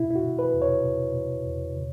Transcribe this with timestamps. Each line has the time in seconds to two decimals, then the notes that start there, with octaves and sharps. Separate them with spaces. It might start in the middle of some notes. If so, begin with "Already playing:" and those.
Already playing: B2 E4
0.10 E4
0.15 F#4
0.24 B2
0.39 B4
0.54 E2
0.62 C#5
0.84 B2
1.15 B2
1.45 E2
1.76 C#3